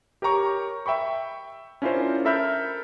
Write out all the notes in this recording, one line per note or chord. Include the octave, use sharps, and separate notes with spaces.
G4 A#4 C#5 A#5 C#6
E5 G5 B5 C#6
C#4 D4 E4 F4 A#4 C5
A4 A#4 E5 B5 F6 G6